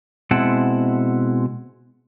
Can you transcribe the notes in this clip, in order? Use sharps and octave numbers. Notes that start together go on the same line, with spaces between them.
B2 G#3 C4 E4 F#5 A5